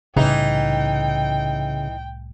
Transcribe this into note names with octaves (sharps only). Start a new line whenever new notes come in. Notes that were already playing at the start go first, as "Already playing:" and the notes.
C2 A2 C#3 E3 D#4 G5